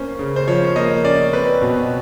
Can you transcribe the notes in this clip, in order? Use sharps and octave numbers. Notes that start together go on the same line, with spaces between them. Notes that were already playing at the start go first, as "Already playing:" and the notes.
Already playing: A#3 C#4 C5
C#3
C5
F3 C#5
A#3 D#5
C#4 D5
C4 B4
B2